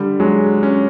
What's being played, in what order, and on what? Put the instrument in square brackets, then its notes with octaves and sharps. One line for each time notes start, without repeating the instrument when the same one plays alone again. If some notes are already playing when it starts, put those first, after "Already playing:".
Already playing: [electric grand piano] D3 [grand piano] G3
[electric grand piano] F#3 [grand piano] G#3
[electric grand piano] C#4